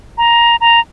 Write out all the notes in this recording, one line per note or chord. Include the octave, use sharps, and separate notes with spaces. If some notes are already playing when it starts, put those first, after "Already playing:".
A#5
A#5